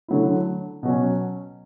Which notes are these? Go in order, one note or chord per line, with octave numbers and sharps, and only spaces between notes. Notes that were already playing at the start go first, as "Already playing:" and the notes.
D3 F#3 A3 E4
B2 F#3 C#4